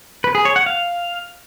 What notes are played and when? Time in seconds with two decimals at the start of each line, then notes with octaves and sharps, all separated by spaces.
0.24 B4
0.35 G#4
0.45 C#5
0.56 F#5
0.66 F5